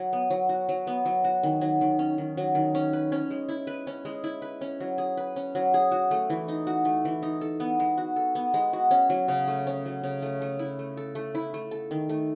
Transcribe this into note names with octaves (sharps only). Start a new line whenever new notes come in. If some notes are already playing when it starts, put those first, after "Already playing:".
Already playing: F#3
B3
F#3
F#4
F#3
B3
F#3
F#4
D#3
F#3
D#3
C#4
D#3
F#3
D#3
C#4
B4
C#4
G#3
E4
B4
C#4
G#3
E4
B4
C#4
F#3
G#4
B4
C#4
F#3
G#4
F#4
A3
E3
D#4
F#4
A3
E3
D#4
A4
B3
G#3
F#4
A4
B3
G#3
F#4
C#4
F#3
C#3
A3
C#4
F#3
C#3
A3
A3
E4
A3
A4
A3
E4
A3
A4
D#3
A3